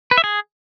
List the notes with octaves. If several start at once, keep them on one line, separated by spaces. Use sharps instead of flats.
B4
E5
G#4